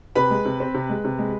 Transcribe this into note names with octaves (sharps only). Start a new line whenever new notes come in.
C3 B4 B5
G#3
C3
C4
C3
G#3
C3
G#3